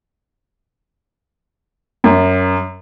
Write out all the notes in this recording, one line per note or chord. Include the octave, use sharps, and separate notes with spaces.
F#2